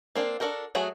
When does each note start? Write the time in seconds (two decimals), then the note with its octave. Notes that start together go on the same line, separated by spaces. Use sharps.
0.15 A#3 C4 D4
0.40 D4 F#4 A4 A#4 G5
0.75 F#3 A3 F#4 G#4